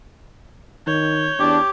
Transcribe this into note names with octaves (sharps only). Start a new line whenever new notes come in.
D#3 C#5 G6
E2 D4 G4